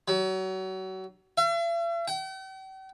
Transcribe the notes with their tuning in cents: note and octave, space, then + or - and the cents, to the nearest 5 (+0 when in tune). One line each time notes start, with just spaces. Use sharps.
F#3 +30
E5 +45
G5 -45